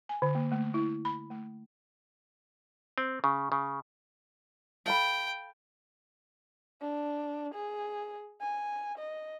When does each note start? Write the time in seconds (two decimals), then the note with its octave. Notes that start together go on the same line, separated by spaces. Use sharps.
0.09 G#5
0.22 D3
0.35 A#3
0.52 A3
0.74 E4
1.05 B5
1.30 A3
2.98 C4
3.24 C#3
3.52 C#3
4.86 A4 F5 G5 B5
6.82 D4
7.54 G#4
8.41 G#5
8.98 D#5